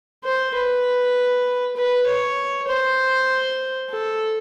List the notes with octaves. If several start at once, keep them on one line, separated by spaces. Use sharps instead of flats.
C5
B4
B4
C#5
C5
A4